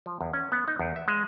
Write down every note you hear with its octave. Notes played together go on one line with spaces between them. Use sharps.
F3
E2
C#4
B3
D#4
E2
E5
G#3